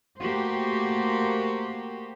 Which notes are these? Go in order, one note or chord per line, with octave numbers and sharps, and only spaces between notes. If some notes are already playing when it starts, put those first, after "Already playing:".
A3 A#3 F#4 G4 C5